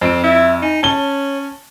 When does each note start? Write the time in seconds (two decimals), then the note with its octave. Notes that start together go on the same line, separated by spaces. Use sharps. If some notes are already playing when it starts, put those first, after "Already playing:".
0.01 F2 C4 D7
0.23 E4 E5
0.62 D#4 G#5
0.83 C#4 C#5 A5 G7